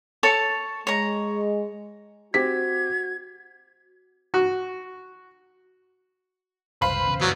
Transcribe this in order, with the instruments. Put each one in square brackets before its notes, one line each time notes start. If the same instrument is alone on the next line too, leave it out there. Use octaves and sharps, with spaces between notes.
[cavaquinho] A4 C#5 A5
[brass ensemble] G#3 [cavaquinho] C#5 A#5
[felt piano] C4 G4 B6 [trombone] F#4 [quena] G#6
[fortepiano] F#4
[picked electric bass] F#1 C2 [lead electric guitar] B4 [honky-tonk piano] C5 F5 B5
[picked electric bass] E1 E2 C#3
[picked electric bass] F#2 C#3 E3 [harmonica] F#3 [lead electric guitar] G3 B3